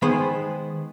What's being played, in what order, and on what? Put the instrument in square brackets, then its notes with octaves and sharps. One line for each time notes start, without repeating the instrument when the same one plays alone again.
[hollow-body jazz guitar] D#3 G#3 B3 G#4 C5 B5